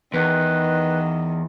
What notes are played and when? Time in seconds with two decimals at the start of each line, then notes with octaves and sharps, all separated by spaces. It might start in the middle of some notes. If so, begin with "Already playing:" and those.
0.14 E2 D#3 B4